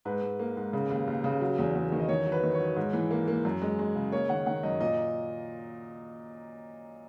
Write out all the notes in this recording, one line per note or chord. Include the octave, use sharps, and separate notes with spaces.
G#2 B4
G#2
A#3
G#2
C#3
D#2
D#2
C#3
F#3
E2
E2
D#3
D#5
D#3 C#5
F#3
B4
D#3
C#5
F#3
G#2
E3
A#3
A#3
F#2
G#3
G#3
C#3
A#3 C#5
D#3 F#5
D#3 F#5
F#2 D#5
A#2 D#5